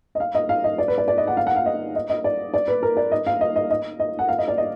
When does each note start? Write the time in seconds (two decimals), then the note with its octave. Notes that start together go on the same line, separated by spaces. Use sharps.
0.15 D#5
0.20 F5
0.35 D#5
0.49 F5
0.64 D#5
0.78 D5
0.88 B4
0.98 D5
1.08 D5
1.17 D#5
1.27 F#5
1.37 F5
1.47 F#5
1.56 F5
1.66 D#5
1.95 D#5
2.10 D#5
2.24 D5
2.54 D5
2.68 B4
2.83 A#4
2.97 D5
3.12 D#5
3.27 F5
3.41 D#5
3.56 D#5
3.70 D#5
4.00 D#5
4.19 F#5
4.29 F5
4.38 D#5
4.48 D5
4.58 D#5